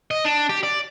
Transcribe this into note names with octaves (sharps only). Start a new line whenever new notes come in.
D#5
D4
G4
D5